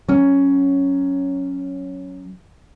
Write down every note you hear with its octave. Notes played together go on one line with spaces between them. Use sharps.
F#3 C#4